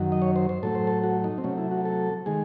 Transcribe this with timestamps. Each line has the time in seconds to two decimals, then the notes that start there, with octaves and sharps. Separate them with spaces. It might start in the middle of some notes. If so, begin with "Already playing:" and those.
Already playing: F#2 D#3 F#3
0.12 D#5
0.22 C#5
0.36 C5
0.49 C5
0.63 A2 F#3 A3 A4
0.75 C5
0.87 A4
1.04 F#4
1.24 D#4
1.38 C4
1.44 C3 F#3 A3 C#4
1.58 E4
1.71 F#4
1.85 A4
2.26 D#3 G#3 G#4